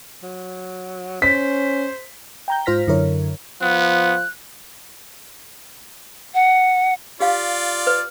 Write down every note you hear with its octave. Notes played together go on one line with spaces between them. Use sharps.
F#3
C#4 C5 B6
G5 A#5 G6
G#2 F4 C5 F6 A#6 B6
F#2 D3 E4 A#4 C#5
F3 B3 F#6
F#5
F4 G4 D5 F5
B4